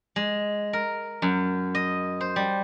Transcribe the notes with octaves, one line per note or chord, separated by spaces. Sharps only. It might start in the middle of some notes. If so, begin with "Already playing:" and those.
G#3
A#4
F#2
D#5
C5
G3